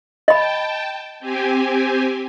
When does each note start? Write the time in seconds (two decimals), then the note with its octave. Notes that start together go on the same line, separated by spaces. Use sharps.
0.28 D#5 G5 A5 B5
1.20 C4 G4 G#5